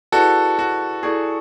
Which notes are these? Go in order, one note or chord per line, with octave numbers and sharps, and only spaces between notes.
E4 F#4 G#4 A4 B4 D5 A5
F#4
E4 G#4 A4 D5 G#5 C#6